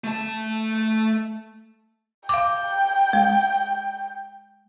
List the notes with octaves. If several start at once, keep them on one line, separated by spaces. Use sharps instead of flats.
A3 A5
F5 G5 D6
G#3